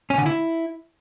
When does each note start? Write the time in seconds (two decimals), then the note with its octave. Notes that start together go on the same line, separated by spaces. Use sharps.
0.10 C#4
0.18 D3
0.26 E4